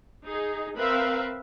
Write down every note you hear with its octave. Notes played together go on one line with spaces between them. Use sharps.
D#4 G#4
C4 A#4 B4 E5 F5